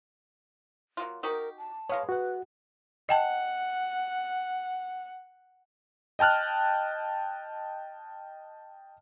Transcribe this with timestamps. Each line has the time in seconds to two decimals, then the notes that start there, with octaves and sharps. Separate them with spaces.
0.97 F#3 A#3 F4
1.23 D#4 F#4 G4 A#4
1.58 A5
1.89 G#3 B3 C#5 F5
2.09 F#4 B4 F#5
3.09 D#5 F#5 G5 A5
6.19 D#5 G5 A5 F6 F#6